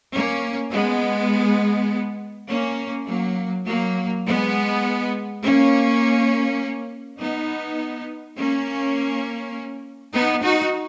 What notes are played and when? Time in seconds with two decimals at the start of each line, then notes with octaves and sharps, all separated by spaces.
0.13 A#3 C#4
0.72 G#3 B3
2.49 A#3 C#4
3.07 F#3 A#3
3.66 F#3 A#3
4.25 G#3 B3
5.43 A#3 C#4
7.19 B3 D#4
8.37 A#3 C#4
10.13 B3 D#4
10.42 D#4 F#4